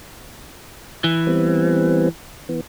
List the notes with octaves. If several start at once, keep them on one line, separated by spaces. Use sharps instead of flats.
E3
G3 B3 C4
E3 B3